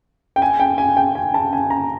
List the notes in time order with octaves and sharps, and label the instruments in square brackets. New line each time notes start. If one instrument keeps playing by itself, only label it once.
[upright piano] G5
G#5
G5
G#5
G5
G#5
A5
G#5
A#5